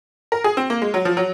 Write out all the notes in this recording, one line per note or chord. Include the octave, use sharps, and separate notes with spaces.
A#4
G#4
C4
A#3
G#3
F#3
F3
F#3